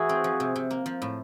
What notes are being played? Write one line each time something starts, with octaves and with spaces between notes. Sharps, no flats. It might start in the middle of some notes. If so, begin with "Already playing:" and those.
Already playing: E3 A3 E4 F#4 G#4
C4
F3
C3
C3
A#3
F3
A2